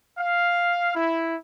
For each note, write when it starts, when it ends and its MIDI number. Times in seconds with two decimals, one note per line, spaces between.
0.17 0.91 77
0.94 1.34 64